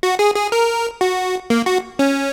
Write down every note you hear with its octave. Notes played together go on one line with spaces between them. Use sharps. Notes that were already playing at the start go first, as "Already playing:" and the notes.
F#4
G#4
G#4
A#4
F#4
A#3
F#4
C#4